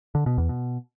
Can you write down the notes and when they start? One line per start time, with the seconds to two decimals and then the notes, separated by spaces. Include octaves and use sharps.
0.15 D3
0.26 B2
0.38 E2
0.49 B2